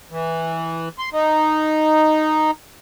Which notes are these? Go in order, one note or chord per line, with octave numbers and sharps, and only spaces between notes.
E3
C6
D#4